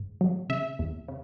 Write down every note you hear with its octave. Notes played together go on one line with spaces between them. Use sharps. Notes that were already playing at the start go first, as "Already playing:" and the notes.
Already playing: G#2
F#3
C#3 E5
E2
C#3